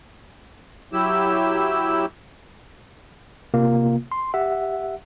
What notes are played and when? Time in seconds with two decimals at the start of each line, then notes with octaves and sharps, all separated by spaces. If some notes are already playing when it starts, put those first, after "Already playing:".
0.93 F#3 E4 G4 E6
3.54 C3 A#3 F4
4.12 C6
4.34 G4 E5 F#5